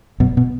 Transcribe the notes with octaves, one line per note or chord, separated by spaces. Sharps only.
F#2 B2
B2